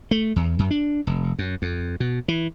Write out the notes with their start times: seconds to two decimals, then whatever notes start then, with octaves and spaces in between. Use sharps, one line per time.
0.11 A3
0.36 E2
0.59 F#2
0.71 D4
1.07 F1
1.39 F#2
1.62 F2
2.00 B2
2.28 E3